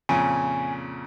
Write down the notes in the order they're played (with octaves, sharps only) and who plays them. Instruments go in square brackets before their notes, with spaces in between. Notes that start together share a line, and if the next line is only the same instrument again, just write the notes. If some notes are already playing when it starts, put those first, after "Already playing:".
[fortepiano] F2 A#2 C#3 [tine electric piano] G#5